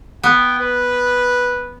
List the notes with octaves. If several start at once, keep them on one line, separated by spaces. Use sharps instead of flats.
B3 G5
B4